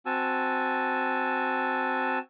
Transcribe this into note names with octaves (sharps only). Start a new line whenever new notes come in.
C4 F#4 G#5 A5 E6